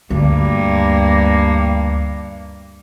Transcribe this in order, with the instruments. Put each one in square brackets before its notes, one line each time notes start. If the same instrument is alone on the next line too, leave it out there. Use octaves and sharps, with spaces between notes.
[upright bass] D2 [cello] G2 A#3